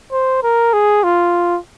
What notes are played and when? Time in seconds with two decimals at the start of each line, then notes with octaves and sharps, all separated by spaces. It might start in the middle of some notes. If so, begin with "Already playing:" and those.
0.12 C5
0.43 A#4
0.73 G#4
1.03 F4